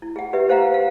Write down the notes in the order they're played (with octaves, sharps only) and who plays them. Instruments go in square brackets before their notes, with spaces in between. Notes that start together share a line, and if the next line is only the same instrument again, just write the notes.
[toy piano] E4
G#4 F#5
G4 B4 E5
G#4 C5 F5 F#5 A#5
F5